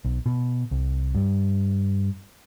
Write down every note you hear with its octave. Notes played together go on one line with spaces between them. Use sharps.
B1
B2
C2
G2